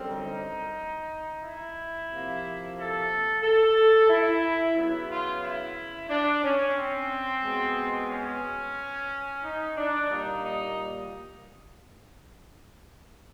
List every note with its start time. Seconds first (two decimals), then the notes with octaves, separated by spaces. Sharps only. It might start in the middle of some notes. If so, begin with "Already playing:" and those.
Already playing: F#2 D3 G3 C4
0.09 D#4
1.43 E4
2.09 C3 F3 A#3
2.77 A4
3.43 A4
4.10 E4
4.76 C#3 F#3 B3 E4
5.10 F4
5.43 E4
6.09 D4
6.44 C#4
6.76 C4
7.43 B2 G#3 B3
8.10 C#4
9.43 D#4
9.77 D4
10.10 A#2 G3 A#3 D#4
10.44 D#4